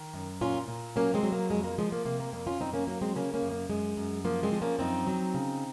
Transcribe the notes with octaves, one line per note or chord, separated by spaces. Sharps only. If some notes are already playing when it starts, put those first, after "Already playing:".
Already playing: D#3
F#2
A#2 C#4 F4
A#2
F#3 A#3 C#4
G#3 C4
F#3
A#3
F2 G#3
A#3
F3 G#3
A#3
C3 A#3
A#3
F2 A#3
C#4 F4
F#2 C4 D#4
A#3 C#4
F#3 A#3 C#4
G#3 C4
C#3 A#3 C#4
A#3 C#4
F#2
A#3
F#2 G#3
F#2
F3 A#3
G#3 C4
F3
A#3 C#4
F#2 C4 D#4
F#3
C#3